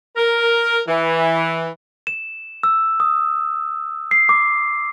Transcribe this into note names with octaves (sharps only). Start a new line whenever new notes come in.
A#4
E3
E7
E6
D#6
C7
D6